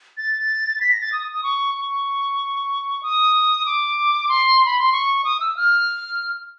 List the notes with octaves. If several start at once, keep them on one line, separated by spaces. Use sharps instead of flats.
A6
B6
A#6
A6
D#6
D#6
C#6
C#6
D#6
D6
C6
B5
C6
C#6
D#6
E6
F6